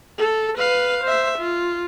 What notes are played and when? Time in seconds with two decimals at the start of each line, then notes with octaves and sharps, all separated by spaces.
0.19 A4
0.58 B4 F5
1.03 C5 E5
1.38 F4